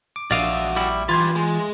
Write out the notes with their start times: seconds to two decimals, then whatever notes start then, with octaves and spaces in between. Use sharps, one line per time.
0.16 D6
0.31 A#1 F#4 D5 E5 F5 D6 D#6
0.76 G3 E4
1.09 E3 F4 G4 B4 C6 G#6 A6
1.36 G#3